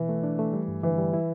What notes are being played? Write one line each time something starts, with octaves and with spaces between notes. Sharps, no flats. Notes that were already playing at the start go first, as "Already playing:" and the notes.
Already playing: B2 E3
A3
D4
A3
G3
G2
D3 E3
G3
E4